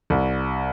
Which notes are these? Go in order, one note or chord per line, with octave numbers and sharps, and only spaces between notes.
C2